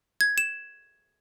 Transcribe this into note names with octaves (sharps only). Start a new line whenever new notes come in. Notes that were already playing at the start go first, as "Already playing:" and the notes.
G#6
E7